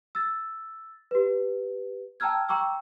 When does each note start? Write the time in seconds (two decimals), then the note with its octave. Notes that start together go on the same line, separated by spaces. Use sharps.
0.15 E6 A6
1.11 G4 B4
2.20 G5 A5 A#5 E6 F6 G#6
2.49 G5 A#5 C#6 D6 E6